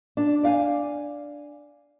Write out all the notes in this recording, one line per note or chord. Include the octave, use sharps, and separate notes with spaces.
D4
D5 F5 F#5 G#5